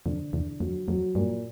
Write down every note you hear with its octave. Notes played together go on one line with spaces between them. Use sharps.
F2 D3
E2 D3
F2 F#3
F2 F#3
G2 A#2